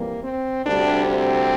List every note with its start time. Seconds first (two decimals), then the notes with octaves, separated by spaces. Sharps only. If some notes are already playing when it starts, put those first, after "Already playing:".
Already playing: F2 C3 E3 G3 A#3
0.24 C4
0.65 D2 C3 G3 D4
1.06 C4